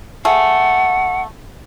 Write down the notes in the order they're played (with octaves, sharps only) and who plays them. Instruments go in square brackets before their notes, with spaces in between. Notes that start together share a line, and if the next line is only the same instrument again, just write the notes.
[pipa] A3 G#4 [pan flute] F#5